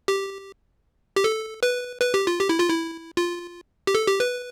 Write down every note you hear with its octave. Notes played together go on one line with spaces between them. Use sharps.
G4
G4
A4
B4
B4
G4
F4
G4
E4
F4
E4
F4
G4
A4
G4
B4